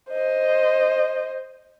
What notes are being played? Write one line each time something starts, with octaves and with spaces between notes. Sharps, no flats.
C5 D#5